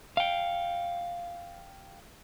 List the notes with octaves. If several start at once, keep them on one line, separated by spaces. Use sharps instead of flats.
F5 G5